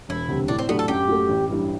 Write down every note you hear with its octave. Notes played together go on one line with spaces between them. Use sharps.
E1 E4
D2 C3 G3
A2 D4
C4
F#3 A3 B3 D4 G4
A4
F#2 G4
F#3 A3
A1
G2 E3 G3